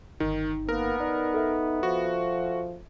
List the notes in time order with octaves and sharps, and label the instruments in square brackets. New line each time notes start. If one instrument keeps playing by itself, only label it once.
[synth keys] G1 D#4 [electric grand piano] D#3
[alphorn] A#3 [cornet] B3 [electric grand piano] A#4
[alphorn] D#4 [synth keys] D5
[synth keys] A4 E5
[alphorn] F3 [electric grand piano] F#4